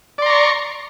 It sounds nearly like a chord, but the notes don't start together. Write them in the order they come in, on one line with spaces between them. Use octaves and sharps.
D5 C6 A#5 C#6